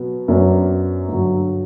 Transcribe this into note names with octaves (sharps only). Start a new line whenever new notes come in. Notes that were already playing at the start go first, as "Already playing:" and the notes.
Already playing: B2 F#3 B3 F#4
F#2 F#3 B3 D4
G2 D3 F#3